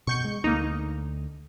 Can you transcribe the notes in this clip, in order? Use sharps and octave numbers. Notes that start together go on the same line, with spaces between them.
B2 C#6 G6 C#7
G#3
D2 A#3 D#4